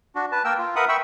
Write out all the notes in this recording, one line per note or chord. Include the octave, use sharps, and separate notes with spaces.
D4 F#4
B4 A5
A#3 A#4 G5 E6
F4
A#4 B4 E5 F#5 B5 D#6
E5 G5 B5 C#6 E6